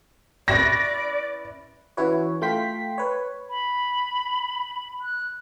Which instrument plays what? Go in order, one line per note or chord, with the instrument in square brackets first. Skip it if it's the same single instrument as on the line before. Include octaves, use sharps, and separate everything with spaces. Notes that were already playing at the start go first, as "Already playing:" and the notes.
[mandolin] C#4 E4 B4 [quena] D5 [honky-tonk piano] A#6
[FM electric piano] E3 C#4 E4 F#4 B4 C#5
A3 F4 G5 C6 B6
B4 C#5
[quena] B5
F#6